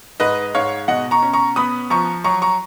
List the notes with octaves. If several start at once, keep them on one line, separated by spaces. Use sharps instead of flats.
G#2 B4 D#5
G#2 C#5 F5
B2 D#5 F#5
A#5 C#6
C#4
A#5 C#6
B3 B5 D#6
F3 A#5 C#6
F#3 A#5 C#6
A#5 C#6